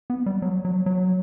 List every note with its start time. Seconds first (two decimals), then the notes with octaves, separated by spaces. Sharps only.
0.10 B3
0.26 G3
0.42 F#3
0.65 F#3
0.86 F#3